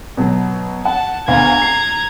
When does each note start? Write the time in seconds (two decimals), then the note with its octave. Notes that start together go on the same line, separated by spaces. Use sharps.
0.17 B2 F#3
0.85 F#5 A5
1.28 D2 B3 F5 A#5 G#6
1.62 C7